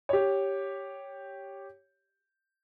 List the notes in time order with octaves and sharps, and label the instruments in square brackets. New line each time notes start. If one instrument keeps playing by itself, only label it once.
[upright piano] G4 C#5